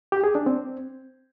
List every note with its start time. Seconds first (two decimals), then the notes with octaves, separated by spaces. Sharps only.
0.12 G4
0.24 G#4
0.35 D4
0.46 C4